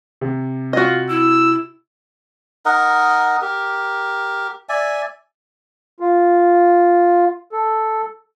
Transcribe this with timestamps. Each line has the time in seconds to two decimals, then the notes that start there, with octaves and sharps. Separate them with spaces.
0.21 C3
0.73 F4 F#4 D#5
1.10 E4 E6
2.66 D#4 A#4 D#5 F#5
3.42 G4 A#4
4.69 D5 E5 G#5
6.00 F4
7.52 A4